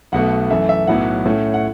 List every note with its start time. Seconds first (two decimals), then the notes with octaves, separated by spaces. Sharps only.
0.12 B1 B2 A3 F#5
0.50 F#2 E3 A3 E5
0.69 E5
0.87 B1 A2 F#3 B3 E4 F#5
1.26 A2 A3 C#4 E4
1.54 F#5